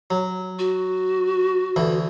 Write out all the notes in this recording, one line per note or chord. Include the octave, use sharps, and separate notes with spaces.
F#3
F#4
D2 E3